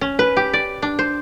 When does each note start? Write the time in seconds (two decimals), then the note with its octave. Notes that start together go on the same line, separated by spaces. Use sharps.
0.01 C#4
0.19 B4
0.37 G4
0.53 D5
0.82 D4
0.99 C5